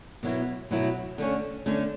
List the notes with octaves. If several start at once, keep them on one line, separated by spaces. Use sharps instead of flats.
B2 F#3 B3 E4
B2 F#3 B3 E4
D3 A3 C#4
D3 A3 C#4